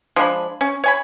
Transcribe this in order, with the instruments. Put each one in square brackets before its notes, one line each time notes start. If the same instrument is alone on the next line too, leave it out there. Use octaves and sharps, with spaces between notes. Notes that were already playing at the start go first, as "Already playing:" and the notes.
[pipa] F3 G#3 D4 B5
C#4
C#5 G#5 B5